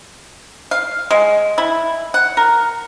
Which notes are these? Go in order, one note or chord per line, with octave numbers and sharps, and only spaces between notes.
F5
G#3
E4
F#5
A#4